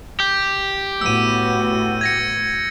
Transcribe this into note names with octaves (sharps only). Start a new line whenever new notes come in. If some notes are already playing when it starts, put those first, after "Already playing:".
G4 G6
A2 B3 F#4 E6 D#7
G#6 A#6 C#7